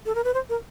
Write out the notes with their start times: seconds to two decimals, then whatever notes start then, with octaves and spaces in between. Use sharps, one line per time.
0.06 A4
0.15 A#4
0.24 B4
0.34 C5
0.49 A#4